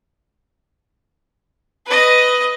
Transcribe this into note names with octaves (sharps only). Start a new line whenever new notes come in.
B4 D#5